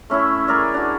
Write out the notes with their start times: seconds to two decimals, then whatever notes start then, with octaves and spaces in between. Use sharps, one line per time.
0.10 A3 C#4 E4 E5
0.47 G#4 A#4 D5 E5
0.74 D4 F#4